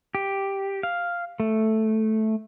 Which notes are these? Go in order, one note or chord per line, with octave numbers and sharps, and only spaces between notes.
G4
F5
A3